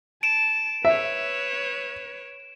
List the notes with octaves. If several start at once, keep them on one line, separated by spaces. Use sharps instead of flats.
A5 D7 E7
B4 C#5 E5